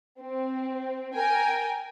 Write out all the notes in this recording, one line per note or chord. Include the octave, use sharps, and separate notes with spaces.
C4
A#4 G5 G#5